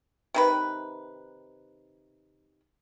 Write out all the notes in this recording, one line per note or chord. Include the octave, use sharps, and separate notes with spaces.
C3 D#3 B4